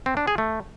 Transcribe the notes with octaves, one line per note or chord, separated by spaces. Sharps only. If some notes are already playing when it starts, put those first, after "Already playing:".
C4
D4
G#4
A3